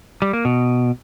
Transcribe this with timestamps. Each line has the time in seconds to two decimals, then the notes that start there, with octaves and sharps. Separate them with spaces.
0.22 G3
0.33 A#3
0.45 B2